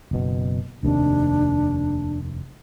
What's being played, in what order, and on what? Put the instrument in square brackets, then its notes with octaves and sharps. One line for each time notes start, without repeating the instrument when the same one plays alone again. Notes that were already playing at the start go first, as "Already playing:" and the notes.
[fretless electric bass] F#1 B2
[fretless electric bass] F1 D#2 C3 [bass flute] D4